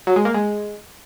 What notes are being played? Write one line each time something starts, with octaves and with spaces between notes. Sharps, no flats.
F#3
G#3
A#3
G#3